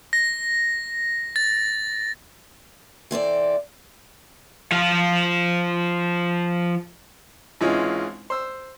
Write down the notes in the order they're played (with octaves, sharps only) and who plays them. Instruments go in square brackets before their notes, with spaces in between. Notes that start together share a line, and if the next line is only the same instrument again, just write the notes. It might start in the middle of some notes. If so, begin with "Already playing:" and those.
[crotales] A#6
A6
[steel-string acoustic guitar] E3 C4 A4 D5
[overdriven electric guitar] F3 F5
[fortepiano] G#1 E3 G#3 C#4 F4
C5 E6